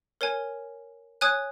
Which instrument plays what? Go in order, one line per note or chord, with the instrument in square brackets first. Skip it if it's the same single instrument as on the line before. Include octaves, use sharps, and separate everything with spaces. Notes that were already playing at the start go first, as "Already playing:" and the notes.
[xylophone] A#4 C#5 G#5
C#5 G#5 D#6 F#6